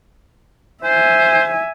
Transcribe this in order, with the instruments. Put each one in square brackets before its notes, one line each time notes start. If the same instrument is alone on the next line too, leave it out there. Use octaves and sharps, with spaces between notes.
[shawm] C5 [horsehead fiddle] E5 G#5